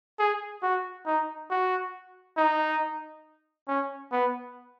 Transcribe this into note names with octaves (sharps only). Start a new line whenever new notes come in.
G#4
F#4
D#4
F#4
D#4
C#4
B3